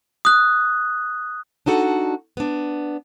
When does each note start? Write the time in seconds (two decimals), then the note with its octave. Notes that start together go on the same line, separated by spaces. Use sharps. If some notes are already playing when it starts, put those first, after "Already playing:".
0.25 D#6 F#6
1.66 D4 D#4 F#4 A4 F#5
2.37 B3 D4